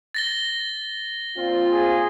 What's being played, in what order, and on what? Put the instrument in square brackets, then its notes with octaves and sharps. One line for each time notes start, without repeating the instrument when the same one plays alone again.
[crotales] A6 A#6 G7
[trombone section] A#2 C4 F4
[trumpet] G#4